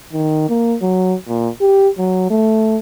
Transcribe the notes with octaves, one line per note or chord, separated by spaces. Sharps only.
D#3
A#3
F#3
A#2
G4
F#3
A3